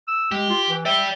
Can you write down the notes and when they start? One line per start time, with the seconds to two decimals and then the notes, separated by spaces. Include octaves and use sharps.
0.08 E6
0.32 G#3 G4
0.50 F4
0.69 E3
0.85 D5 E5 G5